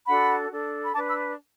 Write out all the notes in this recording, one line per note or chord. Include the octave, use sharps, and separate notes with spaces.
D4 F#4 A4 F#5 B5
D4 A4
B5
D4 B4 A5 D6
B5 E6